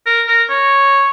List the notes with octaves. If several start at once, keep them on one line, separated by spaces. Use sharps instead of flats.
A#4
A#4
C#5